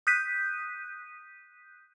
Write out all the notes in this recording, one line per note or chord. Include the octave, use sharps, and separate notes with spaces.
D#6 F#6 G6 B6 D#7